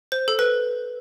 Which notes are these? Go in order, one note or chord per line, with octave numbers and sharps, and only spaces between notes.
C5
A4
B4